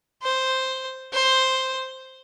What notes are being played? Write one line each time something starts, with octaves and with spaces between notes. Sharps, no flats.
C5
C5